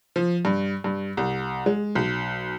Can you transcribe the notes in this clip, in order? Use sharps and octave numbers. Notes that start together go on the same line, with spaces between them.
F3
G2
G2
C2
G#3
B1